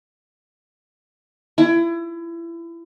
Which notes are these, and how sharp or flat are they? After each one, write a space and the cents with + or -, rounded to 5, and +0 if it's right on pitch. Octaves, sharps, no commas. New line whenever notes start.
E4 +30